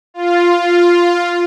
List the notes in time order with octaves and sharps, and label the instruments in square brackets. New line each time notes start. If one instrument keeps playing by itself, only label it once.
[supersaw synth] F4